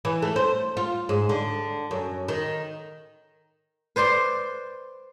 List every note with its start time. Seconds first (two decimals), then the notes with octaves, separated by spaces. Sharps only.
0.05 E3
0.22 A3
0.36 C5
0.77 F4
1.09 G#2
1.29 D3
1.91 F#2
2.28 D#3
3.96 B4 C5 D5 C6